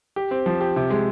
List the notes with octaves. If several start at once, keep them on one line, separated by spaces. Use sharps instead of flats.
G4
C4
F3
G4
C3
G#3